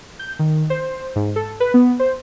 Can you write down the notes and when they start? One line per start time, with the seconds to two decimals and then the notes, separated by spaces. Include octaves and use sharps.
0.19 G6
0.39 D#3
0.70 C5
1.16 G#2
1.36 A4
1.60 B4
1.74 B3
2.00 C5